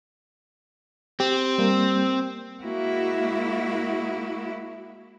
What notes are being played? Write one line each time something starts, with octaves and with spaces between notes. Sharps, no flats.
C4 G4
G3 A#3
G#3 A#3 E4 F#4